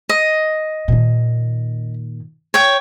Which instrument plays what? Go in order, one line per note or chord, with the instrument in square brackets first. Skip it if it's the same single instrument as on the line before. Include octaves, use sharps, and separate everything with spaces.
[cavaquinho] D#5
[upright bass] A#2 D#3
[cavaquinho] C#5 G5